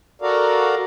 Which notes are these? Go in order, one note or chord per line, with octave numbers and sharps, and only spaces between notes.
F#4 A4 A#4 D5 F5